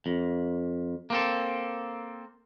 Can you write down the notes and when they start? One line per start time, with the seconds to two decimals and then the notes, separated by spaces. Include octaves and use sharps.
0.06 F2
1.10 A#3 C4 A4